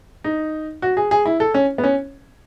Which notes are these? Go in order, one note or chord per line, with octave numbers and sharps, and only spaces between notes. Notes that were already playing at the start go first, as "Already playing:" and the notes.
D#4
F#4
G#4
G#4
E4
A4
C#4
B3
C#4